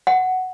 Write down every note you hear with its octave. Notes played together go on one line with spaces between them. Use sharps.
F#5